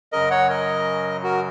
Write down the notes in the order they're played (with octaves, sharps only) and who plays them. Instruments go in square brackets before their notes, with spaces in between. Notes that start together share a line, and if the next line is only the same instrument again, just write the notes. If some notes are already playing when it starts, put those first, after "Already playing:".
[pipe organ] F#2 C#3 F#3 [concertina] A#4 D#5
[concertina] C#5 F#5
A#4 D#5
F#4 A#4